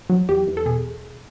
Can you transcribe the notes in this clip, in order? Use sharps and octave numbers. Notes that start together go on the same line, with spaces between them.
F#3
E2 G4
E2
A4
B2 G#4